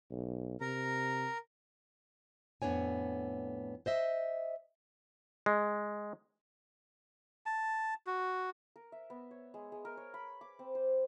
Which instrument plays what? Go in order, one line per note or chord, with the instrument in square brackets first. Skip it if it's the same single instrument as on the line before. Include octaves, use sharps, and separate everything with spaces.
[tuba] B1
[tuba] C3 [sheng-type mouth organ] A#4 A#5
[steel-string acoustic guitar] F2 A2 B3 D4 C#5 G#5
C5 D#5 E5
[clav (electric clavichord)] G#3
[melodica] A5
F#4
[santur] A#4
E5
B3
C#5
G#3
G#3
A#4
C#5
B5
D6
C4
C5